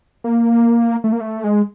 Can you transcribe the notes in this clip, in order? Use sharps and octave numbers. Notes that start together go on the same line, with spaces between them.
A#3
A3
A#3
A3
G#3